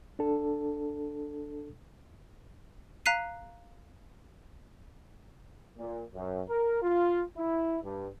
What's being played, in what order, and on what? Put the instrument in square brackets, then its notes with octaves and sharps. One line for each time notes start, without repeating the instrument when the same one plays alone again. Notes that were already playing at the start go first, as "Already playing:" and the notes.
[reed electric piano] D4 A4
[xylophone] F5 A#5 F#6 B6 C7 D#7
[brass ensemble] A#2
F#2
A#4
F4
E4
G2